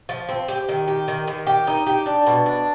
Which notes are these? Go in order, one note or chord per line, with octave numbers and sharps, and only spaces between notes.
F3
C4
G4
D#3
G4
D#3
D#3
G4
D#4
G4
D4
B2
D4